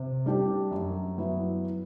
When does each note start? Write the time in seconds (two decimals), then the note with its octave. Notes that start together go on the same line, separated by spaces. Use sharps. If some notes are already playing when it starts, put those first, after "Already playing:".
Already playing: C3
0.26 G3 D4 G4
0.71 F#2
1.18 F#3 B3 E4